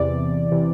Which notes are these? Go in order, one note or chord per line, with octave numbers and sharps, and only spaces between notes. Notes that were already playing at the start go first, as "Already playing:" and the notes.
Already playing: E2 C3 E3 D5
C3 E3